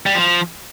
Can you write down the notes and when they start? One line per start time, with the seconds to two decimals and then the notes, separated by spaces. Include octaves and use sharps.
0.06 G3
0.15 F3